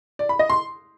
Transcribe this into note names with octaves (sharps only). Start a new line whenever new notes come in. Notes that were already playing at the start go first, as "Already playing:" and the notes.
D5
B5
D#5
C6